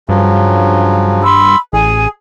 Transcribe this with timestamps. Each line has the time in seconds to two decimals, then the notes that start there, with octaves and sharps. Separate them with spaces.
0.09 G2 C#3 F3 F#3
1.22 B5 C6 E6
1.73 A1 G#4 G#5